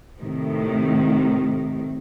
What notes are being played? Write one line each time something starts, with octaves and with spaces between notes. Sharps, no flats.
A2 C3 D#3